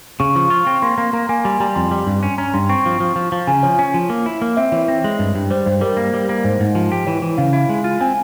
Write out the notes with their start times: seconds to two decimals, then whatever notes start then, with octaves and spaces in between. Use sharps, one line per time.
0.20 C#3 C#6
0.36 F3 C#6
0.50 F4
0.67 C4
0.82 A#3 C6
0.98 A#3 C6
1.13 A#3 A#5
1.29 A#3 G#5
1.44 G3 C6
1.60 G3 A#5
1.76 F2 C6
1.91 G3
2.07 G2
2.23 C#4
2.38 C#4 A#5
2.54 G2 C6
2.69 C4 C#6
2.86 F3
3.00 F3
3.16 F3
3.32 F3
3.47 C#3 G#5
3.63 F3 C#5
3.79 C#4
3.94 F3
4.09 A#3
4.26 E4
4.42 A#3
4.57 C4 E5
4.72 E3 C#5
4.88 C4
5.04 G#3
5.19 G2
5.35 G2
5.51 G3 C5
5.66 G2 C5
5.81 G3 A#4
5.97 A#3
6.14 G3
6.29 A#3
6.44 G#2 C5
6.60 G#2
6.75 F3
6.92 G4
7.07 E3 C#5
7.22 E3
7.38 C#3 F5
7.53 E4
7.69 G#3
7.84 F4
8.01 C4 G#5